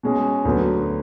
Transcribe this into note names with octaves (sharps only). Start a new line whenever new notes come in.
B2 G#3 C#4
D2 D3 F#3 B3